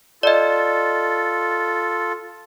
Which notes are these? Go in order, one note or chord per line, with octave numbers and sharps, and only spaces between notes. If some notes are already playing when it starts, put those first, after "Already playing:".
F4 A4 D5 D#5